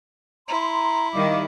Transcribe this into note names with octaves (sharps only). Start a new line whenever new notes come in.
E4 A#5 C6
D#3 G3 D#5 F5 D6